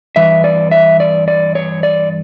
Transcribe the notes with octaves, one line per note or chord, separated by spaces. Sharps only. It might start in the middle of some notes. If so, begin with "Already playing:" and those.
G2 E3 E5
D5
E5
D5
D5
C#5
D5